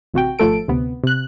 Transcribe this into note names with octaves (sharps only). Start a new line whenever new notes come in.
A1 C3 F#4 G5
G#1 F3 A3 A4 D7
D2 C3 B3
C3 F#6